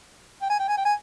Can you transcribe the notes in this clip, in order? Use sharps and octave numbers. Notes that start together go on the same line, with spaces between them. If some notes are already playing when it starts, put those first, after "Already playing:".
G5
G#5
G5
G#5
G5
G#5